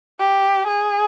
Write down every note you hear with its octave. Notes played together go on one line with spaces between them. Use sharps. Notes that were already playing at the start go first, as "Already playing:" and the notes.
G4
G#4